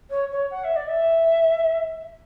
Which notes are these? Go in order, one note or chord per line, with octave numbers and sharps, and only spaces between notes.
C#5
C#5
F#5
E5
D5
E5